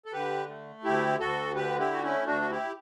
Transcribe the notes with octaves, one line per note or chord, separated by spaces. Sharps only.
A4
D3 G4 B4
A3
D2 E4 G4
D2 F#4 A4
D3 G4 B4
E4 G4
A3 F#4
C#4 E4
D2 D4 F#4
F#4
E4 G4